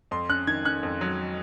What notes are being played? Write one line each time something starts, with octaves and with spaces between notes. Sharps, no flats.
F2 C6
C#4 F#6
D#3 G#6
C#4 F#6
F2
F#3